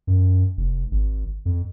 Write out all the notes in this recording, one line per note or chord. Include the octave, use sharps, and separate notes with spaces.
F#2
F1
G#1
F2